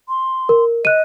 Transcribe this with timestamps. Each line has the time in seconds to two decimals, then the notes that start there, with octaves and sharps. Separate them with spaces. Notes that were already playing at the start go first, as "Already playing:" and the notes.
0.09 C6
0.49 A#4
0.85 D#5 F#6 D#7